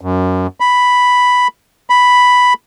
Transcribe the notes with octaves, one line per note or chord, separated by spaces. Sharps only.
F#2
B5
B5